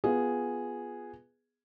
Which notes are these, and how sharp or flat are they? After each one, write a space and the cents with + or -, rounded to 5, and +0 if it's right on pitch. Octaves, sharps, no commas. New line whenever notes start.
B3 +0 F4 +0 G#4 +0